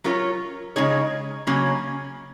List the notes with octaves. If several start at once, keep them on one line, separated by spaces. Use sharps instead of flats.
F#3 C#4 F4 A#4 C#5
C#3 G#3 D#4 G#4 C#5
C#3 F#3 A#3 C#4